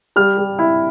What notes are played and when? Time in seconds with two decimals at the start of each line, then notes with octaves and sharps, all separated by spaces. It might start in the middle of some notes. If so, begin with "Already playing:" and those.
0.16 G3 F6
0.38 G3
0.59 E4